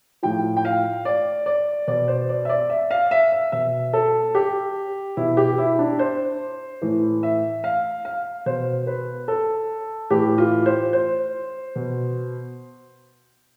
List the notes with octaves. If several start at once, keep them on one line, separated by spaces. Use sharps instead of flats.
A2 F3 G5
G5
F5
D5
D5
B2 D5
C5
D5
E5
D5
E5
F5
E5
E5
B2 E5
A4
G4
B2 E4
G4
E4
D4
C5
A2 E3
E5
F5
F5
B2 C5
B4
A4
A2 E3 G4
F4
C5
C5
B2